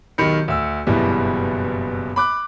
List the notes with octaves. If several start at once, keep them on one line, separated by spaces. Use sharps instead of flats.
B1 D#3 G4 B5 C#7
D2 E6
F#1 G2 B2 E3 G3
B5 D6 F#6